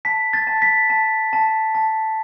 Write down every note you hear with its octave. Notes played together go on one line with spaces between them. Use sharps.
A5 B6
A6
A5
B6
A5
A5
A5